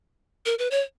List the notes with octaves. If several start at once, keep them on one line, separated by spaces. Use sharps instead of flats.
A#4
B4
C#5